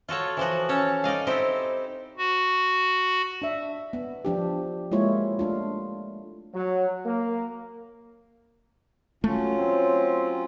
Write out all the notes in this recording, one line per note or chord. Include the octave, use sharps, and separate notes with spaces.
F4 F#4 A4 C#5
E3 F3 F#4
C#4 A4 C#5
D#4 D5 D#5 F5
C4 D#4 E4 G4 C5 D#5
F#4
D4 E5
B3
F3 D4 G4
G#3 A#3 E4 F4 C#5 D#5
A3 D4 F4
F#3
A#3
F#3 A3 C#4 F4
C4